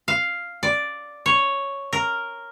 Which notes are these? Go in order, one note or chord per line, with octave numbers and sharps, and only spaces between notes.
F5
D5
C#5
A#4